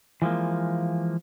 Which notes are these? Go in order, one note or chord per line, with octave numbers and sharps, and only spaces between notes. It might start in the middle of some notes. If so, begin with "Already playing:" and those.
E3 F3 G#3 A#3